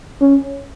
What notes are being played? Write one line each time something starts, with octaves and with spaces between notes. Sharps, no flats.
C#4